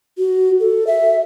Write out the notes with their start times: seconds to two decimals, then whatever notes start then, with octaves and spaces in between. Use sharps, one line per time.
0.18 F#4
0.60 A4
0.87 E5